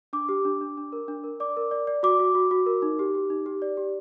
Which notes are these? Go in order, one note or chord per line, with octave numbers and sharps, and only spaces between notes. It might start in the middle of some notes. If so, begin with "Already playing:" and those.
D4 D6
G4
D4
D4
D4
A#4
D4
A#4
D5 D6
A#4
D5
D5
F#4 D6
F#4
F#4
F#4
A#4
D#4
G4
G4
D#4
G4
D5
G4